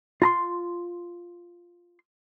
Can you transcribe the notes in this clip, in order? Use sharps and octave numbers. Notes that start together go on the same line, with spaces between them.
F4 A#5 C6